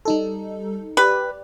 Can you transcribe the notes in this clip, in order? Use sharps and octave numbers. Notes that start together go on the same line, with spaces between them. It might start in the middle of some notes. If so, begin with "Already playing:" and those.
G3 D#4 A4
G4 B4 D5